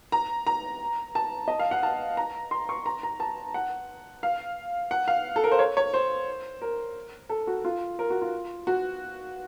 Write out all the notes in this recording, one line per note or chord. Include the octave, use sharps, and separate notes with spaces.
A#5
A#5
A5
D#5
F5
F#5
A5
A#5
C6
C#6
A#5
A#5
A5
F#5
F5
F#5
F5
A4
A#4
C5
C#5
C#5
C5
A#4
A4
F#4
F4
A#4
F#4
F4
F#4